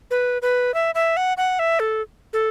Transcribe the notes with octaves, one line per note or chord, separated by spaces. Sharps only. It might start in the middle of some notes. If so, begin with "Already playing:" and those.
B4
B4
E5
E5
F#5
F#5
E5
A4
A4